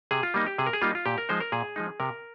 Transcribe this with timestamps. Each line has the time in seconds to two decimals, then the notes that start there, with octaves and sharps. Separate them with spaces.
0.11 C3 G#4
0.23 F4
0.34 G3 A#3 D#4
0.46 G4
0.58 C3 G#4
0.66 A#4
0.73 G#4
0.82 G3 A#3 D#4 F4
0.95 F4
1.06 A#2 G4
1.18 A#4
1.29 F3 G#3 D#4 C5
1.40 A#4
1.52 A#2 G#4
1.76 F3 G#3 D#4
2.00 C3 A#4